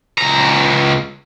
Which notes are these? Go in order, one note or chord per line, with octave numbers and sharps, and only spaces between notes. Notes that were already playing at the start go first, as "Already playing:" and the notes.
C#2 A#5